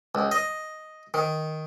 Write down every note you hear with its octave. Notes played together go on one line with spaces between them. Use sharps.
C#2
D#5
D#3